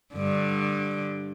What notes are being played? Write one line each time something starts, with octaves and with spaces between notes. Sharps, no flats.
G2 D3